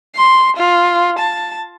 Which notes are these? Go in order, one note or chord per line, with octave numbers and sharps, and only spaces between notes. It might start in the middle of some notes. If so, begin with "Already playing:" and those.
C6
F4
A5